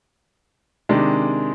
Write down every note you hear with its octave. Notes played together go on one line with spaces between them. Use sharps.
C3 D#3 G#3 D4